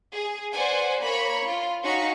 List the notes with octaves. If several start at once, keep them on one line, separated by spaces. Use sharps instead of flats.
G#4
B4 C5 D5 F#5 G#5
A#3 C#5 B5 C#6
F4
C#4 D#4 F#4 F5 B6 C#7